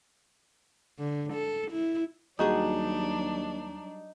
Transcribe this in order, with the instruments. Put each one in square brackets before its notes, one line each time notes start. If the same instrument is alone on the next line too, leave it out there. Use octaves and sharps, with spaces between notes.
[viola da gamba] D3
A4
E4
[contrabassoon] D#2 [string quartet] F#3 D4 [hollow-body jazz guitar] G3 F#4 G#4 [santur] D#4